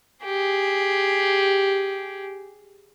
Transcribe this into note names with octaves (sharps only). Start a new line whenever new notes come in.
G4 G#4